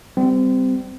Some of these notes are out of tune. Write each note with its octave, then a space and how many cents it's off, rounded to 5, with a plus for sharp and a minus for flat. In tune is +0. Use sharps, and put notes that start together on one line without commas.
G3 +0 C4 -25